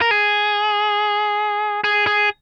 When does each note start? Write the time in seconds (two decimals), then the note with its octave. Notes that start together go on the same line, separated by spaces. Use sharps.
0.01 A#4
0.11 G#4
1.84 G#4
2.07 G#4